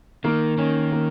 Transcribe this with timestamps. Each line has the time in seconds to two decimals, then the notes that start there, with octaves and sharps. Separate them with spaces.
0.24 D#3 A#3
0.58 D#3 C#4
0.92 A#3